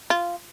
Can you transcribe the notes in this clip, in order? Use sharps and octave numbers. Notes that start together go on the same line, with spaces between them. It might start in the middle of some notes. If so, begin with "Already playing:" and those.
F4